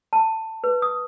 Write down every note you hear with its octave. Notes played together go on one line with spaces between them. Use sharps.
A5
B4
D#6